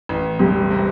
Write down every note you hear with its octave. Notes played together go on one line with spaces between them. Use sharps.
A1
E1 G3
C3